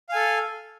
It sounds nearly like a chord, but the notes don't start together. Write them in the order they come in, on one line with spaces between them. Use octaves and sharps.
F5 G#5 A4